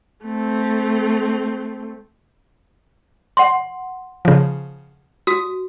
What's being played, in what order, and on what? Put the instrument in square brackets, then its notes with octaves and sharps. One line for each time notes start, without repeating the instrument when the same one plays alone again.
[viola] A3 C4
[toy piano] F#5 C6
[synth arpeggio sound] C#3 F3
[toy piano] F#4 [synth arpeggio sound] D#6